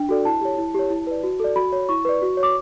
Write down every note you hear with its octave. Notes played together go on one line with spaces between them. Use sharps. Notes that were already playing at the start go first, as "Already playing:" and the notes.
Already playing: D4 G5
F#4 A4 D5
E4 A5
G4 C#5
E4
G4 C#5
E4
B4 D5
F#4
A4 D5
F#4 B5
C#5
E4 C#6
B4 D5
F#4
C#5
D6